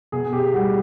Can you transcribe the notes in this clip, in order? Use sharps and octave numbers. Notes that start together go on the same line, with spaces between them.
B2 G#4
G4
G3 F#4